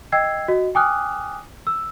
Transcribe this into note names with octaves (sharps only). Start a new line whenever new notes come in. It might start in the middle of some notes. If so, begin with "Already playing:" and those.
D#5 G5 E6 G#6 C7
F#4 D#5
G5 G#5 D6 D#6 F6 F#6
E6